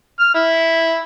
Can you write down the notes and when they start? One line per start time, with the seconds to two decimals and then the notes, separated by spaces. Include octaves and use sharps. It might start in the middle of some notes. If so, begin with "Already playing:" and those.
0.20 F6
0.35 E4